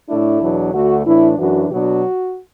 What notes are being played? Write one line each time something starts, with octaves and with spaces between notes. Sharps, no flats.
A2 A3 D4 E4
E2 B2 F#3 D4
D2 D3 A3 F#4
A2 E3 D4 E4
F#2 E3 D4 F#4
B2 F#3 D4 F#4